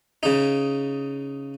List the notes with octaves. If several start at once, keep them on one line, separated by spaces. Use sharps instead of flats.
C#3 D#4